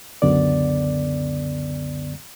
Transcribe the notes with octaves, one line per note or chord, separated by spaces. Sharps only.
C#2 F#2 D3 B3 D5